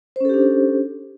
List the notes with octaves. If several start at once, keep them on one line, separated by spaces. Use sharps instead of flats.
C#4 D4 G4 A4 C5